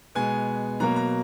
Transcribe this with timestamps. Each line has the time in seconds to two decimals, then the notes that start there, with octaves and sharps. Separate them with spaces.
0.15 B2 G#3 B3 G#5
0.80 B2 F#3 A#3 A#5
0.96 A#5